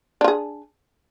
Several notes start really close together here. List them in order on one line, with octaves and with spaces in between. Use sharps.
D4 F4 G#4